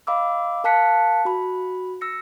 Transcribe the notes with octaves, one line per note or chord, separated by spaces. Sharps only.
D#5 F5 B5 D6 E6
A#4 F5 A5 F#6 B6 C#7
F#4 B5
E6 A#6 C#7